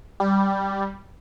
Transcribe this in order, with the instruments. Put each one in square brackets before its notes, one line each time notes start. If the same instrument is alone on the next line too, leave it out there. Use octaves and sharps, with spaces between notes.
[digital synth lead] G3